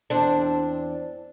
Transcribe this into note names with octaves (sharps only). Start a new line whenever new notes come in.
E2 C4 D4